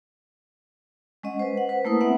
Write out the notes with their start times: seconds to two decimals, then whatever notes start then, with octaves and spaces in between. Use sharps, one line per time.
1.23 G#3 C#4 D#5 F#5
1.39 B4 C5
1.57 F#5
1.69 B4 C5
1.85 A3 A#3 E4 A#4 B4 D#6
2.01 B3 C4 E5 F#5